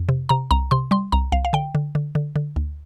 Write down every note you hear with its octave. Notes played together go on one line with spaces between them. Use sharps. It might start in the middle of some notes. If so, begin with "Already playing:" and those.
Already playing: F2
C3
C3 A#5
C2 A#5
C3 C6
G3 C6
C2 A#5
C2 F5
F5
D3 G5
D3
D3
D3
D3
D2